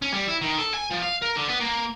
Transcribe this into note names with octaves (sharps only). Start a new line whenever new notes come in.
C#4
G3
E4
D#3
A4
G#5
F3
F5
A#4
D3
B3
A#3